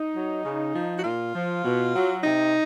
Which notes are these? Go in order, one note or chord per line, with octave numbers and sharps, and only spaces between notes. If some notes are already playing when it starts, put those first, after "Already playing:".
Already playing: D#4
F#3
C#3
F3
F#4
A#2 F4
F3
B2
F#3
C3 D#4